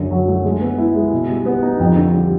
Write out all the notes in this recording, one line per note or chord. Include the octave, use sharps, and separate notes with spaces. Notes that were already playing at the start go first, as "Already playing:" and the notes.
Already playing: F#2 D3
F#3
A3
G#3
B3
E4
G#3
B2
G3
B3
D#4
F2
D3
G3